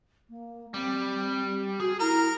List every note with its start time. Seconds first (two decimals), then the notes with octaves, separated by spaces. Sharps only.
0.29 A#3
0.74 G3 C4
1.80 F#4 G#4
2.00 E4 A#4 A#5